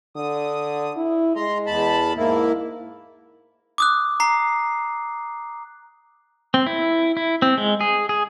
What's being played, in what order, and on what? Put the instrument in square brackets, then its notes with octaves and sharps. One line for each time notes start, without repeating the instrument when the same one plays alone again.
[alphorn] D3 [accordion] D#6
[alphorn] E4
[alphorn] G#3 [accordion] A#5 C6
[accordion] E2 A5 B5
[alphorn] G#2 [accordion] A#3 E4
[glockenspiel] D6 D#6 F#6
A#5 C7
[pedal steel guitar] C4
E4
E4
C4
G#3
G#4
G#4